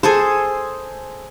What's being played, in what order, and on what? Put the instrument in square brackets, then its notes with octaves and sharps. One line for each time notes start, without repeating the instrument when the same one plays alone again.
[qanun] G#4 A4 C5